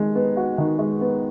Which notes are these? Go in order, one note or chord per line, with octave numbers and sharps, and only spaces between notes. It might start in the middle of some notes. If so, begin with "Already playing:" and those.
Already playing: D#3 G#3
B3
F#4
D#3
G#3
B3